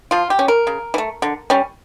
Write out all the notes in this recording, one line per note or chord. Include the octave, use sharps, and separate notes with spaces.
F3 F4
G4
C#4
A#4
C#3
E3
A3
D3
G3 C#4